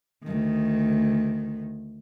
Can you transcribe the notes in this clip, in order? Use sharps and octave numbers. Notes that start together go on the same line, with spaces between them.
D2 D#3